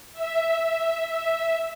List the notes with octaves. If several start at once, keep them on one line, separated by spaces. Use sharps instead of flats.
E5
E5
E5